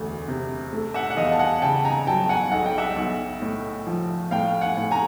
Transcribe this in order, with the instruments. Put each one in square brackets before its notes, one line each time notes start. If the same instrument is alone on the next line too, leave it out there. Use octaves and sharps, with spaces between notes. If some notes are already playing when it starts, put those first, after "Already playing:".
Already playing: [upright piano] E1 D2
C3
A3
E5 F#5
F#5
E2 D#5 F5
A5
F#5 G#5
C#3 G5 A5
G#5 A#5
F#3 G5 A5
F#5 G#5
B1 F#5
G5
E5 F#5
B1
A2
F3
A2 F5 G5
F#5 G#5
A2
G#5 A#5